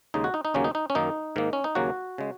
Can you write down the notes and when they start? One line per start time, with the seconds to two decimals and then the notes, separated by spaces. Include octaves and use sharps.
0.14 D#2 C#3 G#3 D#4
0.24 F#4
0.34 D#4
0.45 D#4
0.54 D#2 C#3 F#3 A#3 C#4
0.64 D#4
0.75 D#4
0.90 C#4
0.95 F#2 D#3 A#3 D#4
1.36 G#2 D#3 A#3
1.53 C#4
1.64 D#4
1.75 D#2 C#3 F#3 A#3 F#4
2.18 C#3 G#3